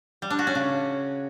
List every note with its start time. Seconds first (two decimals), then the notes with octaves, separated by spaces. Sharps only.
0.22 G3
0.30 D4
0.39 F#4
0.47 C#4
0.55 C#3